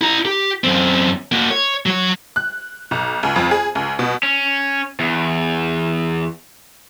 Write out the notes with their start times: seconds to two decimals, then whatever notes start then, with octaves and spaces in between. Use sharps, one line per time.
0.01 E4 A#5
0.25 G4
0.64 F#2 C4
1.32 A#3 F#4
1.51 C#5
1.86 F#3 C#5
2.36 F#6
2.91 B1
3.23 C#2
3.36 F2
3.51 G#4
3.75 C#2
3.99 B2
4.23 C#4
5.00 E2